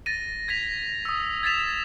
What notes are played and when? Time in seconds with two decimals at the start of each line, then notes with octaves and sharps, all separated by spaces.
0.06 A6 A#6 D#7
0.48 G#6 A#6 B6 F7
1.05 D#6 E6
1.43 G#6 A6 B6 E7 F7